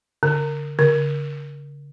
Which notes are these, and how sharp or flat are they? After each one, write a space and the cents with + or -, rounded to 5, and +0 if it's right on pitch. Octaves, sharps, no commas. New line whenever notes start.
D3 -30
D3 -45